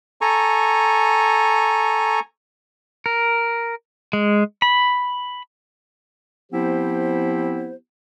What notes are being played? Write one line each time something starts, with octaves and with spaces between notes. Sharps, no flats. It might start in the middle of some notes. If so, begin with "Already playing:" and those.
A4 G#5 A#5 C#6
A#4
G#3
B5
F3 B3 C4 E4 G4 C5